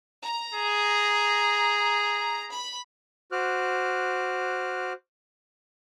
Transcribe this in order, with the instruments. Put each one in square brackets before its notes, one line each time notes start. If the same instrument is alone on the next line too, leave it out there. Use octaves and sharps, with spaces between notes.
[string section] A#5
[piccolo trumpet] G#4
[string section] B5
[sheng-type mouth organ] F#4 C5 D6 F6 F#6